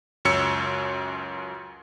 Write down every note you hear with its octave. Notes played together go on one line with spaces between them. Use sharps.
C#2 F#2 C#5 E6 C#7